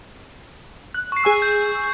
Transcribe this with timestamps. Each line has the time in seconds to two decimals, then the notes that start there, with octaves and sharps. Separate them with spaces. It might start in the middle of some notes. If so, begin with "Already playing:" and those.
0.94 F#6
1.12 C#6 C7
1.24 G#4 G#5 E6
1.42 G6